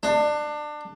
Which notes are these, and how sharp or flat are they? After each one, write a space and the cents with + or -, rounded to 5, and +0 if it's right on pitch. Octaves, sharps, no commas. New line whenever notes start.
D4 +25